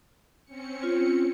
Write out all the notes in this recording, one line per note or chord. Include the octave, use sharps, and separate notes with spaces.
C4 C#4 C#7
F4